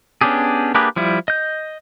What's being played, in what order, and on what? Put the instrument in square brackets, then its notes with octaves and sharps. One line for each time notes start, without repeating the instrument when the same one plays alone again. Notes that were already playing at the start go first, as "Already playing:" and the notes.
[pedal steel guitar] B3 C#4 D4 G4 G#4
A#3 D4 G4 G#4 B4
F3 G3 E4
D#5 G6